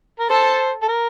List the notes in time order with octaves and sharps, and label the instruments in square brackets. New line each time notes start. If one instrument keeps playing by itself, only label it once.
[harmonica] A#4
[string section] A4 [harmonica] C5
[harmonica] A4
A#4